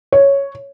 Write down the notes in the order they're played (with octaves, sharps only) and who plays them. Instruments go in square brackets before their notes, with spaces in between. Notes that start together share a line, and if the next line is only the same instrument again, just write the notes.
[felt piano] C#5